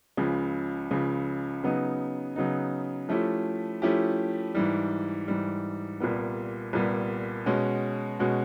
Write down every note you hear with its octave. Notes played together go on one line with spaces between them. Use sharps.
C#2 C#3 F3
C#2 C#3 F3
C#3 F#3 B3 D#4
C#3 F#3 B3 D#4
F3 A3 C#4 E4 G4
F3 A3 C#4 E4 G4
G#2 E3 G3
G#2 E3 G3
C2 A#2 G3 B3
C2 A#2 G3 B3
B2 G#3 C#4 F#4
B2 G#3 C#4 F#4